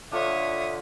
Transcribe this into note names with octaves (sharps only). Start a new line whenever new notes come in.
D3 D4 F4 A4 C#5 E5 D#6